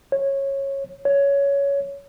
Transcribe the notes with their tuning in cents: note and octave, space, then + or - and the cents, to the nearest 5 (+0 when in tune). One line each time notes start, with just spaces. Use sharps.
C#5 -15
C#5 +15